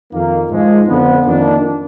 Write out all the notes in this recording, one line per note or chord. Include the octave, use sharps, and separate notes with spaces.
F2 D#3 A#3
G#2 F3 G#3
F2 D3 F3 B3
F2 D#3 A#3 D4